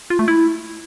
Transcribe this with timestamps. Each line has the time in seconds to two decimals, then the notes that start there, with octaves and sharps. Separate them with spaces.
0.10 F4
0.19 A3
0.28 E4